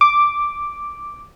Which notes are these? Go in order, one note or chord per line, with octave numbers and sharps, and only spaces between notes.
D6